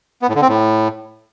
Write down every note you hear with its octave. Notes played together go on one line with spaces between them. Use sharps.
B3
A2
D3
C4
A2